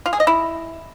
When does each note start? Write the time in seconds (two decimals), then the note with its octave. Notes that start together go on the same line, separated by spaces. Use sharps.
0.06 F4
0.13 G#4
0.20 D#5
0.27 E4